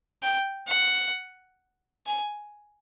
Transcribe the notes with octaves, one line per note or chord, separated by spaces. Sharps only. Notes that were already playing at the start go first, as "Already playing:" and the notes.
G5
F#5
G#5